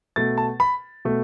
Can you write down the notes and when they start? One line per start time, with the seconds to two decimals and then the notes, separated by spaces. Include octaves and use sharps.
0.16 B2 A3 A6
0.38 A5
0.60 B5
1.05 B2 A3